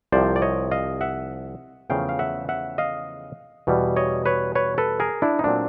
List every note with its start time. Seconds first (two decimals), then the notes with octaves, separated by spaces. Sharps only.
0.12 C2 C3 F3 C5 D5
0.36 D5
0.42 C#5 D#5
0.71 D#5 F5
1.01 E5 F#5
1.90 E2 C#3 F3 A3 C#4 F5 G5
2.09 F5
2.19 E5 F#5
2.49 E5 F#5
2.78 D#5 F5
3.67 E2 B2 G3
3.96 C#5 D#5
4.26 B4 C#5
4.55 B4 C#5
4.78 A4 B4
5.00 G#4 A#4
5.22 D4 E4
5.39 D#4
5.44 A#2 F#3 A3 C4 D4